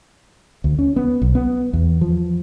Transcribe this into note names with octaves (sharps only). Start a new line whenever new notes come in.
D2
C#4
B3
B1
B3
E2
F3